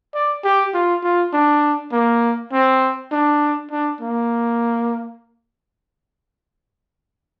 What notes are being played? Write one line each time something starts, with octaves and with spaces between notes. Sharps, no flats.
D5
G4
F4
F4
D4
A#3
C4
D4
D4
A#3